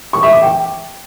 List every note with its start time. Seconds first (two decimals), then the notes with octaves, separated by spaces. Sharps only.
0.13 C#6
0.23 E5
0.33 D6
0.42 G5